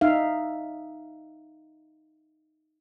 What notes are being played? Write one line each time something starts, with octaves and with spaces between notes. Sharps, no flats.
D#4 E5 F5